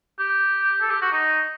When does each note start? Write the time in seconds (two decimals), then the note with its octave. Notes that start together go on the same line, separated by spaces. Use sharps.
0.19 G4
0.81 A4
0.91 G4
1.02 F#4
1.12 D#4